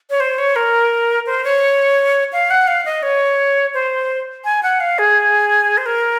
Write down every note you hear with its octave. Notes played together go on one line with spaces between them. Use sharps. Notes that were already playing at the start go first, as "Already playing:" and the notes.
C#5
C5
C#5
A#4
C5
C#5
F5
F#5
F5
D#5
C#5
C5
G#5
F#5
F5
G#4
C5
A#4